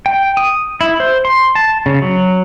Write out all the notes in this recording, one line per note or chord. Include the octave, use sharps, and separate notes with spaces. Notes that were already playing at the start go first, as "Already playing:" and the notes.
G5
D#6
E4
C5
C6
A5
C#3
F#3